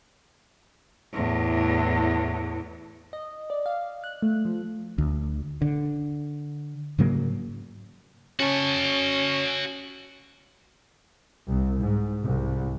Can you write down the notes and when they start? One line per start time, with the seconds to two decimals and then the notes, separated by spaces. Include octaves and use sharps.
1.13 E2 A2
3.13 D#5
3.50 D5
3.66 F5
4.04 F#6
4.22 A3
4.45 F3
4.98 D2
5.62 D3
6.99 G#2 C#3 F#3 A#3
8.40 C#4 F#4 A5
11.47 C2
11.80 G#2
12.24 C2